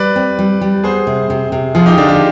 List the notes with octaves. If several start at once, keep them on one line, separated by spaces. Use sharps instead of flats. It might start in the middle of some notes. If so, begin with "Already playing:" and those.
Already playing: G3 B4 D5
C4
G3
G3
B3 G#4 C5
C3
C3
C3
F3 F4 G#4
D#4 G4
D3 D4 F4
D#4 G4